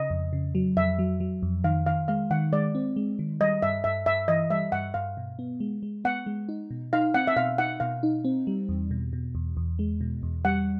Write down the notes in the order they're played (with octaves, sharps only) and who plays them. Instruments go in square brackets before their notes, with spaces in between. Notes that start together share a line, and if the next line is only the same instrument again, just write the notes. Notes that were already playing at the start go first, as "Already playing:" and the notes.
Already playing: [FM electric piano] C#3 [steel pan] D#5
[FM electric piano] F2
C#3
F#3
[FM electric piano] F2 [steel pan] E5
[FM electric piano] F#3
F#3
F2
[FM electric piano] D#3 [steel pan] F5
[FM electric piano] D#3 [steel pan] F5
[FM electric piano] G#3 [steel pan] F5
[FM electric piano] D#3 [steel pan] F#5
[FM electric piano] G#3 [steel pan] D5
[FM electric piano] C4
G#3
D#3
[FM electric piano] G3 [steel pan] D#5
[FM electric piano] G2 [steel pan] E5
[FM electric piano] G2 [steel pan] E5
[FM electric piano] G2 [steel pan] E5
[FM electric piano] E3 [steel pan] D#5
[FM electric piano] G3 [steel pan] E5
[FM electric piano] G2 [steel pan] F#5
[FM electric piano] G2 [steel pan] F5
[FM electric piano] B2
B3
G#3
G#3
[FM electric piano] B3 [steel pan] F#5
[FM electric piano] G#3
D#4
B2
[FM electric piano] D#4 [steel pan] F5
[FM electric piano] C4 [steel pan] F#5
[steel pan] E5
[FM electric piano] B2 [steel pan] F5
[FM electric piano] D#4 [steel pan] F#5
[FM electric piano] B2 [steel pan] F5
[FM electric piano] D#4
C4
G3
E2
B2
B2
E2
E2
G#3
B2
E2
[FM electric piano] G3 [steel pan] F#5